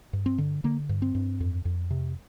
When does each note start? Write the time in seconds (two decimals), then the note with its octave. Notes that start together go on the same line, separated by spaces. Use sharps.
0.13 G2
0.26 C4
0.38 D3
0.64 D3 A#3
0.89 G2
1.02 C4
1.15 G2
1.40 F2
1.65 F2
1.90 C3